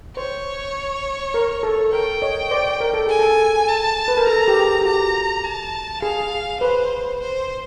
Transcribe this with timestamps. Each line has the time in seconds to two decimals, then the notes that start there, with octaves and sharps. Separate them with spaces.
0.17 C5 C#5
1.34 A#4
1.63 A4
1.92 A#4 G5
2.22 C#5 D#5
2.51 C5 D5
2.80 A#4
2.94 A4
3.07 G#4 G#5
3.19 A4
3.69 A5
4.08 B4
4.17 A#4
4.27 A4 A#5
4.48 G4
4.57 G#4
4.81 G4
4.85 F#4 A#5
5.44 A5
6.02 G#4 F5
6.61 B4 C5
7.21 C5